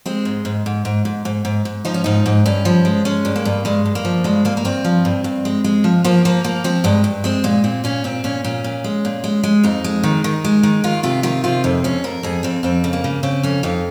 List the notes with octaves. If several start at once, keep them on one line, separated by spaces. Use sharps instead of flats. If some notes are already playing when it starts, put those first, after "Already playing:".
G#3 C4
G#2
G#2
G#2
G#2
G#2
G#2
G#2
G#2
F3 D#4
C#4
G#2 D#4
G#2
G2 C#4
F3
G#3
G#3 C#4
G2
A#3
G2
G2 G#3
G2
A#3
F3
G2 G#3
G2 A#3
A#3
G2 C4
F3
G2
G2
G#3
G#3
F3
F3 A#3
F3 A#3
F3 A#3
F3 C4
G2 G#3
G2
G#3 C4
A#2 G#3
A#2 C4
A#2 C#4
A#2 C4
A#2 C#4
A#2 C#4
A#2
G#3
A#2
G#3
G#3
F2 D#4
G#3
D#3
D#3
G#3
D#3
D#3 F4
C3 F4
D#3 F4
C3 F4
F2 D#4
F2 C#4
F2 A#4
F2 G#4
F2 C4
F2 C4
C#3
A#3
C#3
C#3 C4
F2 C#4
F2 D#4